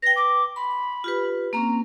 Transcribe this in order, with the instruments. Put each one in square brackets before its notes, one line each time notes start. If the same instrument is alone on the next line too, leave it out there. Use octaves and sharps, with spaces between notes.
[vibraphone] B4 G5 [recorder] A#6
[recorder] D6
[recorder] B5 [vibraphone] C6
[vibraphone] F4 G4 B4
[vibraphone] A#3 C4 C#4 [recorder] A#5